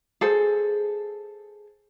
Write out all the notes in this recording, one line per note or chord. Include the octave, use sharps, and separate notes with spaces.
G#4 A4 C5